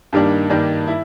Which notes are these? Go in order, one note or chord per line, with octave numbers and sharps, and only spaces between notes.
G2 D#3 G3 A#3 D4
G2 D#3 G3 A#3 D4
E4